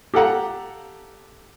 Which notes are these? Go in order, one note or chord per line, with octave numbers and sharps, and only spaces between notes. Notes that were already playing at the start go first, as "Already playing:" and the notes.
G4 A4 F5 F#5 A#5